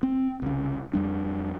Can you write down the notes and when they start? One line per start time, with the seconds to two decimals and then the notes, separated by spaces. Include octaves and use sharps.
0.03 C4
0.42 C2 C#3
0.93 F2 G3 D4